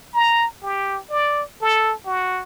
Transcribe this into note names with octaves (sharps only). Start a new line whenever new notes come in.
A#5
G4
D5
A4
F#4